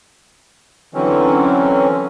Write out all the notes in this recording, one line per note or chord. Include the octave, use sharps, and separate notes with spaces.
D3 E3 F#3 C4 C#4